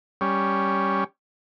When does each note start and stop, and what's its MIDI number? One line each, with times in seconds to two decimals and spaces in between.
0.21 1.04 55
0.21 1.04 61